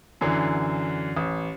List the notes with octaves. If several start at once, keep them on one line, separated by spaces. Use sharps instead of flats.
F#2 D3 E3
A1